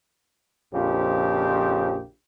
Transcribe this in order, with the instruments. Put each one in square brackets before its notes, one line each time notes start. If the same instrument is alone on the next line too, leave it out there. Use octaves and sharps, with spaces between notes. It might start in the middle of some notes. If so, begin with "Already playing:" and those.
[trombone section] A#1 F2 C#3 F3 G4